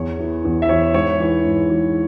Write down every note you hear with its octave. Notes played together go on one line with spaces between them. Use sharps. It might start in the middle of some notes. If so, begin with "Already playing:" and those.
Already playing: E2 C#5
E3
E2
E5
E3 C#5
G#2 C#5
E3
G#2
E3